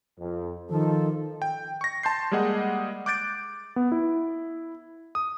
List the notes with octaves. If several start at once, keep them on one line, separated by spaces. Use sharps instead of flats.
F2
D#3 F3 A4
G5
C#6 A#6
A5 C6 G6 C7
G3 G#3 A#3 G#4 D#5 F#5
D6 F#6 G6 A6 D7
B3
E4
D#6